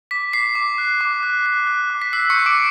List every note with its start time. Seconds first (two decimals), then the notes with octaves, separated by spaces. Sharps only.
0.11 D6 B6
0.33 D6 C7
0.55 D6
0.78 F#6
1.01 D6
1.23 F#6
1.46 F#6
1.67 F#6
1.90 D6
2.02 B6
2.13 E6 C7
2.30 C#6 C#7
2.35 G6
2.46 D6 D7